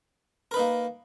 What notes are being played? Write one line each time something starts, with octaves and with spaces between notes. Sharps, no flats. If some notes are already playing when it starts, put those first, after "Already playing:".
A#3 D#4 A#4 B4